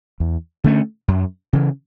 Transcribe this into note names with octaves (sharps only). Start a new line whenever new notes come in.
E2
D3 A3 C#4
F#2
C#3 E3